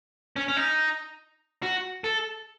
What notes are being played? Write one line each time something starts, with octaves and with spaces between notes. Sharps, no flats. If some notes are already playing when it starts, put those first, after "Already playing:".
C#4
C#4
D#4
F#4
A4